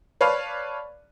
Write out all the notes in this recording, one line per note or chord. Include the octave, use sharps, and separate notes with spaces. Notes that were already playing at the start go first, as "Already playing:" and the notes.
B4 C#5 D5 F5 A5 B5